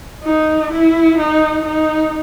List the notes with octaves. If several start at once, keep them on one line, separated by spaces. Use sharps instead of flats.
D#4
E4
D#4
D#4